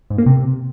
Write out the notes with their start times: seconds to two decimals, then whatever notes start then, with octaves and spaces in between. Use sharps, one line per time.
0.10 G#2
0.18 A#3
0.26 C3